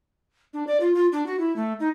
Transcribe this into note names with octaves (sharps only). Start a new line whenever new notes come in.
D4
D5
F4
F4
D4
F#4
E4
A3
D#4